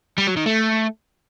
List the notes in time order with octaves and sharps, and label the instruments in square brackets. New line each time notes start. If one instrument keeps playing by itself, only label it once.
[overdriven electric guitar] G3
F#3
D#3
A3